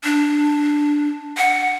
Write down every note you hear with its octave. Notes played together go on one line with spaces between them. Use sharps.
D4
F#5